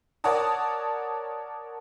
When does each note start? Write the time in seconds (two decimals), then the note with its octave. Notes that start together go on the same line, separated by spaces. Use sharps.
0.24 A#4 C#5 D5 F#5 A5 D#6